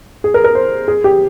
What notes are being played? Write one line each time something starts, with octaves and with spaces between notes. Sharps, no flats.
G#4
A#4
A#4
C5
G#4
G4